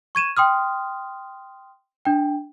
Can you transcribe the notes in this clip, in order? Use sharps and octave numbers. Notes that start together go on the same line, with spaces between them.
C#6 G#6 D#7 E7
G5 C6 D#6 F6
D4 G5